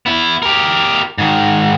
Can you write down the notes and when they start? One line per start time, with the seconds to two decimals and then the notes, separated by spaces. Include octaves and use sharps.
0.06 B3 E4
0.43 G4 A#4
1.18 G#2 D#3